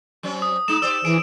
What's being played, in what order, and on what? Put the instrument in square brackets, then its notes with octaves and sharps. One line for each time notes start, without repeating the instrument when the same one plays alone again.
[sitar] F#3 C4 C#4
[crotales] D#6
[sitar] G#3 D#4 [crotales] E7
[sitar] G4 C5 D5 [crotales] E6
[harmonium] E3 [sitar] G#4 [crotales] D7